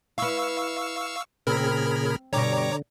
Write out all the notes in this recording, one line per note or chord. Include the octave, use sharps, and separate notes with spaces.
E4 B4 F5 C#6 E6
A#2 C#3 C4 G#4 A#4 B5 F6
G2 B2 D3 G4 C#5 A#5 D6